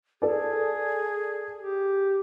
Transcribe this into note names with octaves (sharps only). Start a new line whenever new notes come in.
G#4 A4 D5
G4